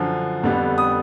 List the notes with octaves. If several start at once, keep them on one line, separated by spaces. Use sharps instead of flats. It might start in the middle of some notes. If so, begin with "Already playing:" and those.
Already playing: F#2 D3 F3
F2 D3 G3 B3
D#6